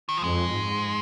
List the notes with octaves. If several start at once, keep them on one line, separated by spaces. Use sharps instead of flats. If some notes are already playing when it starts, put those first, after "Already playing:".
D#3
F3
F2 G#3
G#2